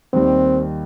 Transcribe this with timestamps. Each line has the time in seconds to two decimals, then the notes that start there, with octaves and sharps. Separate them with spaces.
0.13 D#2 D#3 G3 C4